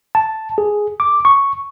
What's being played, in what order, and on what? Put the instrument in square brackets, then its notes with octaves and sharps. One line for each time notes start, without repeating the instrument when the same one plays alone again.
[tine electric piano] A5
G#4
D6
C#6